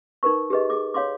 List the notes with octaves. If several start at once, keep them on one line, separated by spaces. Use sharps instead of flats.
D#4 A#4 B4 C#6
G4 G#4 B4 D#5
G#4 D6
C#5 F5 C6 D6